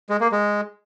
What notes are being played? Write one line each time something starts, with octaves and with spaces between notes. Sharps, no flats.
G#3
A#3
G#3